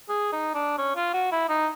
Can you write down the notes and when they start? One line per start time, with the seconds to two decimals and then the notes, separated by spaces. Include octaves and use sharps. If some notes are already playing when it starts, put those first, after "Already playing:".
0.09 G#4
0.32 D#4
0.55 D4
0.78 C#4
0.96 F4
1.14 F#4
1.32 E4
1.49 D#4